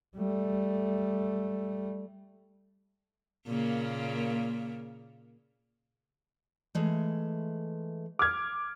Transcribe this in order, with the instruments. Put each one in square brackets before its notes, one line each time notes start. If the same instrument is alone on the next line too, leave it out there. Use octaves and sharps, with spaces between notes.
[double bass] G3 A3
[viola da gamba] A#2 C#3 A#3
[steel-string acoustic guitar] E3 G#3 A3
[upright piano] D6 F6 G#6